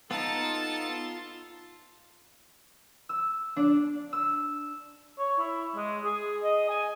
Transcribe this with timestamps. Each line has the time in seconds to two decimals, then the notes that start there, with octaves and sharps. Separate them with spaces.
0.11 B3 D#4 F4 A4 A5
3.09 E6
3.56 D4
4.13 E6
5.18 C#5
5.39 E4
5.76 G#3
6.05 G#4
6.43 D#5
6.69 G#5